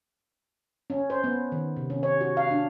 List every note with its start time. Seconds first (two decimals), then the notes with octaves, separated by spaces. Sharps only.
0.90 C#4
1.10 C5
1.24 B3
1.52 D#3
1.77 C3
1.90 C#4
2.03 C#5
2.21 F#4
2.37 F5
2.51 D4